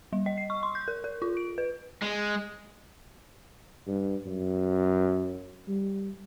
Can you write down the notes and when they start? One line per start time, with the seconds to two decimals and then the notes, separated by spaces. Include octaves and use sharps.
0.13 G3
0.26 D#5
0.37 C7
0.50 C#6
0.63 C6
0.75 G6
0.88 A#4
1.04 A#4
1.22 F4
1.37 D7
1.58 B4
2.02 G#3
3.87 G2
4.26 F#2
5.68 G3